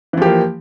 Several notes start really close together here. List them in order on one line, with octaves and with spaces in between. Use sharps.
E3 F3 G4 A#3